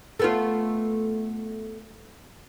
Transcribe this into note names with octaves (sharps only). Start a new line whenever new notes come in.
A3 B3 F4